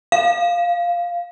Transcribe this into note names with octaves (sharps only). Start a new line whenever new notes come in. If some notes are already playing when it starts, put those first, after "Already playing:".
F5